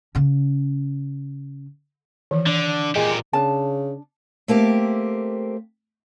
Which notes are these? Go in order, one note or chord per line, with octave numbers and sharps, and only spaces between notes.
C#3 C#4
D#3 E3
D3
A#2 G#3 G4
C#3 D4 A#4 A5
A3 A#3 C4 G4